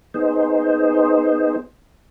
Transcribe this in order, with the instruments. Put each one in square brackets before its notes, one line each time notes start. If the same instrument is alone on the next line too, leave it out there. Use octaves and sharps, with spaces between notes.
[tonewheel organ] B3 D#4 G#4 C5